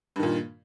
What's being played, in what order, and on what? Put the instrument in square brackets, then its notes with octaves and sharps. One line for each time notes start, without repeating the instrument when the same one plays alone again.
[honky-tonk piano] G2
D#3
A#2